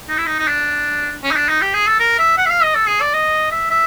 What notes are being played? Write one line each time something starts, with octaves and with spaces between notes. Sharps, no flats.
D#4
E4
D#4
D#4
D4
C#4
D#4
D4
D#4
G4
G#4
A4
A#4
E5
F#5
E5
F5
D#5
A4
G#4
D5
D#5
E5
E5